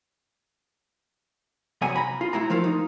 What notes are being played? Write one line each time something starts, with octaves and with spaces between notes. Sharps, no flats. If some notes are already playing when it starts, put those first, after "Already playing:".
F#2 C3 F#5 G#5 A#5
A#5 B5
F4
A3 E4 F#4 A#5
F3 A3 F4 A#4
D#4